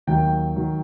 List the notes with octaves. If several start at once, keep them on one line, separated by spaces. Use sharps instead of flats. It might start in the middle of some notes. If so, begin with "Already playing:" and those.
D#2 D#3 F#3 G5
D#3 F#3